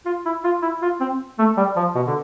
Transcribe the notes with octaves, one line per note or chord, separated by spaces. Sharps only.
F4
E4
F4
E4
F4
C4
A3
G3
F3
B2
D3